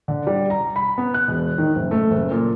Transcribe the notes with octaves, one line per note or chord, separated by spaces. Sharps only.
D3
G3
A#5
B5
B3
F#6
E1
D#3
F#1
A3
F#1
A#2